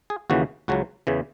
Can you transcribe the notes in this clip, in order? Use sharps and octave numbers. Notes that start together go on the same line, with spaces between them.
G#4
D#2 C#3 E3 F#4
C#2 C#3 F#3 F#4
E2 C#3 E3